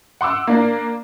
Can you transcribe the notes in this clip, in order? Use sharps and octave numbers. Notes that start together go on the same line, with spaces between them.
F#5 C6 D6 E6
A#3 D4 A#4